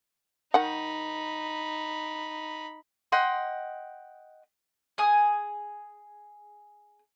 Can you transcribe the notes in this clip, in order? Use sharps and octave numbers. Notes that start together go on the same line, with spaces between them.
D#3 D#4 F#5 B5
D#5 F#5 G5 C6
G#4 G#5 D#6